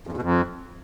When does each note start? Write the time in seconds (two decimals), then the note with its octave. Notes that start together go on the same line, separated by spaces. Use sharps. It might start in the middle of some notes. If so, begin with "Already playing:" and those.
0.07 F2
0.12 E2
0.17 B2
0.22 F2